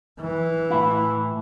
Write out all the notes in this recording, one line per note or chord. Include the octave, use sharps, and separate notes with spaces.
E3
A2 E4